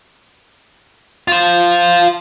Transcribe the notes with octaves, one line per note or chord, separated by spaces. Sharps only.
F4 C5